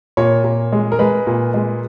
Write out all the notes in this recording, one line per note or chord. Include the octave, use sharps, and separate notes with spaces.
A#2 C#5
A#2
G#3
A#4
G#3 B4
A#2
G#3